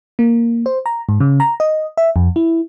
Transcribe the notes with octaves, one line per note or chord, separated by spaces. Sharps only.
A#3
C5
A#5
G#2
C#3
A#5
D#5
E5
F2
E4